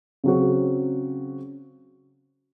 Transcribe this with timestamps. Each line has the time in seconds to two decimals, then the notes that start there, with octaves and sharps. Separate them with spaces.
0.24 C#3 F#3 C4 F#4